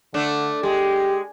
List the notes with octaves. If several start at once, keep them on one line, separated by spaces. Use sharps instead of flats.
D3 A3 D4
G#3 G4